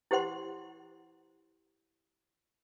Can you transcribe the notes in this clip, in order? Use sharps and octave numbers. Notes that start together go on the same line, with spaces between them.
E4 G4 C5 F#5 C6